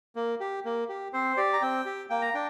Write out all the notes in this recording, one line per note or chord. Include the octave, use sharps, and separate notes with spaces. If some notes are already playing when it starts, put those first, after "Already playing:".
A#3
G4
A#3
G4
C4 C5
G4 D5
A#5
C4 G5
G4
A#3 G5
A#5
D4 G5